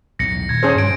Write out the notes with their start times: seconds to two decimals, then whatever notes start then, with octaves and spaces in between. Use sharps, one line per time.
0.19 B1 E2 A2 A#6 C#7
0.49 D#1 G#6
0.63 C#4 G#4 C5
0.78 G2 G3 G#3 D7